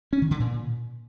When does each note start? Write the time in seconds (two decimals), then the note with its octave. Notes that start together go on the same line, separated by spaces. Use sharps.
0.13 C#4
0.22 D#3
0.31 D3
0.40 A#2